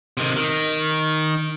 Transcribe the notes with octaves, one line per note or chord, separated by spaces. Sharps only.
C3 D#3
D#3